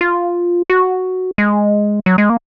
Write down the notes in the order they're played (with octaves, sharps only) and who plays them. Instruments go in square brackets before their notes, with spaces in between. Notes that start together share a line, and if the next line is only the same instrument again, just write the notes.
[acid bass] F4
F#4
G#3
F#3
G#3
A#3